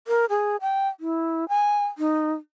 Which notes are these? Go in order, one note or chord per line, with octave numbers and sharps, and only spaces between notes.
A#4
G#4
G5
E4
G#5
D#4